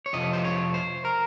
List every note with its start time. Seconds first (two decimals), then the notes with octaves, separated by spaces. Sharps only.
0.06 C#5
0.13 F2 C3 F3 D#5
0.33 C5
0.45 C#5
0.74 C5
1.05 A#4